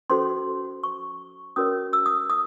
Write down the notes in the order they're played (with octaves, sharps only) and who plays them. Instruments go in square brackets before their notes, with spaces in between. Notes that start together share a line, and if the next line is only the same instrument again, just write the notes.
[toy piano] C#4 F#4 A4 C5 C6
C#6
C#4 F#4 A#4 C#5 D#6
E6
D#6
D#6